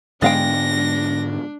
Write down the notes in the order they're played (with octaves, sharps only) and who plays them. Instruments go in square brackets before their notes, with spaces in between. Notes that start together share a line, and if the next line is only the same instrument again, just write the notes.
[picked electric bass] G#2 D3 B3 [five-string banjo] G#3 F5 G5 [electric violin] D4 [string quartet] A#6